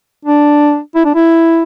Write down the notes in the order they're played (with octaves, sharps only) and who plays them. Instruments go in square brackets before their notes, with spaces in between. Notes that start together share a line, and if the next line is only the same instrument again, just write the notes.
[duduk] D4
E4
D4
E4